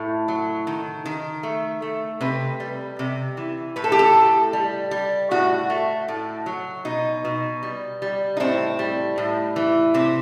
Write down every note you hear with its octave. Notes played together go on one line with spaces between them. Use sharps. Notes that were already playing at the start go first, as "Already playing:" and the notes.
Already playing: A2 A3
F#3
D#3
D#3
A3
A3
C3 B4
G3
C3
E3
A2 B4
A4
G4
A4
A2
G3
G3
A2 F#4
A3
A2
F#3
B2 D#4
B2
G3
G3
D#4
A2 C4
G3
A2
E3
C3 C4